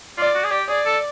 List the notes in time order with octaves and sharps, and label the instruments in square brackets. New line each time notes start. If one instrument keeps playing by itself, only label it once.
[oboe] F4 [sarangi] D5
[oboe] F#4
G#4
G4
[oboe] G#4 [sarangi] D5
[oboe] A4